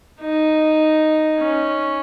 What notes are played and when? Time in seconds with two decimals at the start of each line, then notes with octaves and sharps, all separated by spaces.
0.21 D#4
1.40 C#4